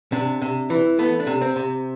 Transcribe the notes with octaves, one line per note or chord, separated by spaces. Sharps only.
C3 D4
C3
E3
A3 B3
D4
C3
C4
C3